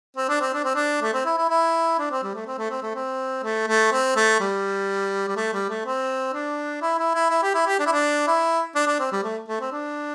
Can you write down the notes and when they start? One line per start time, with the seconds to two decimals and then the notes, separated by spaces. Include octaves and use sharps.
0.17 C4
0.29 D4
0.41 C4
0.54 D4
0.64 C4
0.75 D4
1.02 A3
1.13 C4
1.26 E4
1.38 E4
1.49 E4
1.99 D4
2.11 C4
2.23 G3
2.35 A3
2.47 C4
2.58 A3
2.71 C4
2.82 A3
2.95 C4
3.43 A3
3.67 A3
3.92 C4
4.16 A3
4.40 G3
5.28 G3
5.36 A3
5.53 G3
5.69 A3
5.86 C4
6.34 D4
6.82 E4
6.98 E4
7.15 E4
7.30 E4
7.43 G4
7.54 E4
7.67 G4
7.79 D4
7.86 E4
7.92 D4
8.27 E4
8.75 D4
8.87 D4
8.99 C4
9.12 G3
9.24 A3
9.48 A3
9.60 C4
9.72 D4